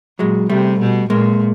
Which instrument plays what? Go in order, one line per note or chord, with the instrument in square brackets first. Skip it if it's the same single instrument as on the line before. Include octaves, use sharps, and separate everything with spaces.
[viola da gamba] A#2 [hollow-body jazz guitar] F#3 G#3
[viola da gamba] C3 [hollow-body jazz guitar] G3 A3
[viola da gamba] B2
[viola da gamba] A#2 [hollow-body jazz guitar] G#3 A#3